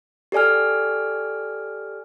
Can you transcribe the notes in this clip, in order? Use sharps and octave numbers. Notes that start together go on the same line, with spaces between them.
G4 A4 D5 G#5 F6